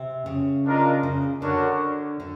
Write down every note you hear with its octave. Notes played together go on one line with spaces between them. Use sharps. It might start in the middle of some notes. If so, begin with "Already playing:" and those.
Already playing: C3
C#3
D4 F4 A#4 D#5
C#3
D3 D4 F#4 A#4 C#5 F#5
D3